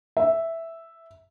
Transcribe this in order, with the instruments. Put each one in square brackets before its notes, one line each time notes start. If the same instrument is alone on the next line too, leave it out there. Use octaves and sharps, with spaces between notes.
[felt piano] E5